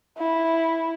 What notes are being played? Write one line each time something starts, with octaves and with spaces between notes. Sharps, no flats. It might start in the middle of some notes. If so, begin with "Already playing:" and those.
E4